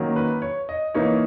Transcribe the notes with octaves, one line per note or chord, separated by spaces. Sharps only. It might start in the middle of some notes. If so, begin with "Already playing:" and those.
Already playing: D#3 F#3 A#3 C#4
B4
C#5
D#5
E3 A#3 D#4 C#5